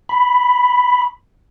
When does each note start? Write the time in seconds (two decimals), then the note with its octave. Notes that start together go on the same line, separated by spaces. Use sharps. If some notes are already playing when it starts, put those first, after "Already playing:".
0.09 B5